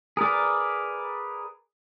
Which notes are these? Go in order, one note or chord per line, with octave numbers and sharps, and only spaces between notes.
G#4 A#4 B4 D5